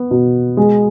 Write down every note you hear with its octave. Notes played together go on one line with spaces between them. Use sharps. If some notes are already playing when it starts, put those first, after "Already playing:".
Already playing: B3
B2
G#3